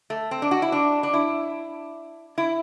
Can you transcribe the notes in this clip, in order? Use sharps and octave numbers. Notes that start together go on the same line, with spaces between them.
A3
C4
D4
F#4
E4
D4
D4
E4
E4